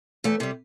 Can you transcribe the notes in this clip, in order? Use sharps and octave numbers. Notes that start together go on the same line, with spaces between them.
E2 A3
C3 G3